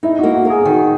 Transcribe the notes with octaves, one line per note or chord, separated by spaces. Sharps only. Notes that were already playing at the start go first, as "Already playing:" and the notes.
D#4 E4
F#4
A#3
F#4
G#4 A#4
D#3 F#4